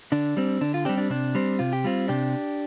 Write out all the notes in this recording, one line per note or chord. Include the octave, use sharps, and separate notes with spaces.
D3 D4
G3 C4
D3 D4
F4
G3 C4 D4 G4
D4
C3 D4
G3 C4
C3 F4
G4
G3 C4 F4
C3 D4 G4